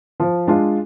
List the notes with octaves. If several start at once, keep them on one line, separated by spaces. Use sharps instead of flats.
F3
G#3 D4 F4